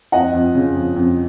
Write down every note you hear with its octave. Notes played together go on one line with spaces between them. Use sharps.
F2 D#5 F#5
F2
C#3
F2
F2